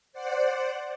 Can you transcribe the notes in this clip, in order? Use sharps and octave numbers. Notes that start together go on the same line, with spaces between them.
C5 D5 F#5